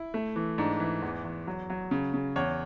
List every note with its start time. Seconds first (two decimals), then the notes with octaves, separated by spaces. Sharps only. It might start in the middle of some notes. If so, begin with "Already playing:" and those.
Already playing: E4
0.14 A3
0.36 E3
0.58 G#2 D4
0.80 E3
1.02 E2
1.25 E2
1.47 F#3
1.70 F#3
1.91 C#3
2.14 C#3
2.36 E2 C#5